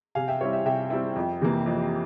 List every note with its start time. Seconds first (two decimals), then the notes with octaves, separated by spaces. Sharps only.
0.15 C3 F5 G#5
0.28 E5 G5
0.41 G3 C4 E4 C#5
0.53 E5
0.65 C3 E5 G5
0.90 G3 C4 E4
1.16 F2
1.41 C3 E3 A#3
1.66 F2